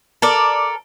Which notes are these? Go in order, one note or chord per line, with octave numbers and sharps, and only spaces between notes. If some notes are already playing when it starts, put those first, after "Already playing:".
A4 A#4 D5